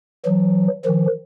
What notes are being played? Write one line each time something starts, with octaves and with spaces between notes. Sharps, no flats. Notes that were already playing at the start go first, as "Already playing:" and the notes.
E3 F#3
D#3 F3